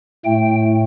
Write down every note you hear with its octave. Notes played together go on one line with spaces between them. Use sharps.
A2 A3 G5